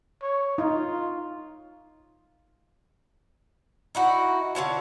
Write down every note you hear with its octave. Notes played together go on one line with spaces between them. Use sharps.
C#5
D#4 F4
D#4 E4 F#4
D3 F4 C#5 A5